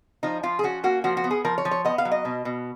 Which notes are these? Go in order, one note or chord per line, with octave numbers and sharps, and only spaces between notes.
F3 D#4
F3 F4
G#4
C#4 F#4
A#3 F#4
F3 F#4
F#4
B3
G#4
F3 A#4
C#5
F3
C#5
B3 D#5
F5
F#3
D#5
B2
B2